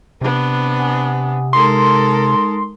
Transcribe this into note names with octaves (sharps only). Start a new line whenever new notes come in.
C3 B3 D4
F#5 G#5 D#6
G#3 D#4 A4 A#4 C6 D#6